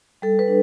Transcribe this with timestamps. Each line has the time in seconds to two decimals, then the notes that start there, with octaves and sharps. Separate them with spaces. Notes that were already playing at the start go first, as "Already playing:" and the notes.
0.22 G3 A4
0.39 B4
0.47 D4